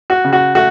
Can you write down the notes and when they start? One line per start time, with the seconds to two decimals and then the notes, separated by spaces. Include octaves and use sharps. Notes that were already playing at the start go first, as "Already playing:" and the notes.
0.10 F#4
0.24 C#3
0.33 F#4
0.55 A3 F#4